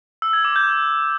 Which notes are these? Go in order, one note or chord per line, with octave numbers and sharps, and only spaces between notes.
E6
G#6
D6
G6